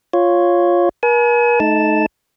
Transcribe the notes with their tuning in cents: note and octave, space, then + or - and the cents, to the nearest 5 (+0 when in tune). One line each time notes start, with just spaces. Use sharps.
F4 +0 C#5 +0
A#4 +45 G#5 +40
A3 -30 D#4 +5 A5 +0